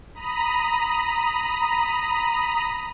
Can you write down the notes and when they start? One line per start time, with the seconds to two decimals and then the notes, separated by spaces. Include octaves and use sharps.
0.14 A#5 B5 D#6